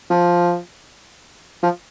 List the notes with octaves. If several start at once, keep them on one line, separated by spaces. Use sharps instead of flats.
F3
F3